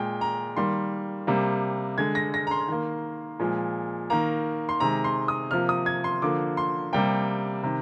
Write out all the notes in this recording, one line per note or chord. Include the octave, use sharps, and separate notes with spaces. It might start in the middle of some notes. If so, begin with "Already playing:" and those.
Already playing: A#2 G#3 G5
A#5
D#3 G3 A#3 C6
C3 G3 A#3
D3 G#3 G#6
A#6
A#6
A#5
C6
D#3 A#3
A#2 F3 G#3
D#3 A#3 A#5
C6
C3 D#3 G#3 A#5
C6
D#6
C3 F3 A#3 F6
D#6
G#6
C6
D3 F3 A#3 D6
C6
C3 G3 A#3 G5
C3 D#3